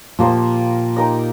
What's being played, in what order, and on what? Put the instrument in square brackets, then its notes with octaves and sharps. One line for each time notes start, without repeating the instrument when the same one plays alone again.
[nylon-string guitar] A#2 [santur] F3 A#3 G4 C5
[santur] D#4 G4 A#4 D#5